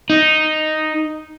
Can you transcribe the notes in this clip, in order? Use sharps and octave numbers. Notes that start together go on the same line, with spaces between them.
D#4